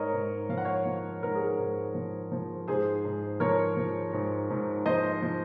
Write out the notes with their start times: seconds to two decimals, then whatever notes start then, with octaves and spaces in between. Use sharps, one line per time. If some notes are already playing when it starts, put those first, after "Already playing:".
Already playing: G#2 A#4 C#5 D#5
0.13 G#2
0.49 F3 F5
0.58 F#5
0.65 C#5 F5
0.85 F3
1.23 G#2 A#4
1.35 G#4
1.47 A#4
1.58 G#2
1.95 F3
2.32 F3
2.68 G#2 G#4 C5
3.05 G#2
3.40 F3 A#4 C#5
3.77 F3
4.13 G#2
4.50 G#2
4.86 F3 C5 D#5
5.22 F3